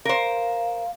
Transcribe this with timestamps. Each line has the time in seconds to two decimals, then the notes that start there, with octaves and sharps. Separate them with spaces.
0.05 A#4 C5 F5